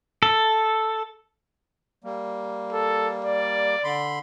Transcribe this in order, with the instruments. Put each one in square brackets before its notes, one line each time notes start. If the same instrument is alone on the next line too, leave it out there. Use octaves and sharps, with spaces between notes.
[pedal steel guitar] A4
[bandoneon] G3 A#3
[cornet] A4
D5
[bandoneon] D3 B5 C6